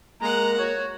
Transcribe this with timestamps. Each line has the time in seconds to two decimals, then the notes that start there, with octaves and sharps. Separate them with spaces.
0.20 G#3 A#3 F#5 A#5
0.58 F#4 C#5